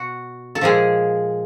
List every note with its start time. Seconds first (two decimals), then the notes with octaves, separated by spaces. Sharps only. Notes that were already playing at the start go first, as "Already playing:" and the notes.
Already playing: B2 F#4
0.55 A4
0.61 A#2 F3 G#3 G#4